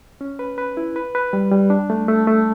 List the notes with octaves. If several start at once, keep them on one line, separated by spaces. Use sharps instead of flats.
C#4
B4
B4
E4
B4
B4
G3
G3
D4
A3
A3
A3